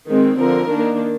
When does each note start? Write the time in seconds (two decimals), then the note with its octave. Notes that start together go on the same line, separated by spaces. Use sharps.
0.09 D#3 G#3 C4
0.39 D3 F3 C4 A#4
0.70 D#3 A#3 D4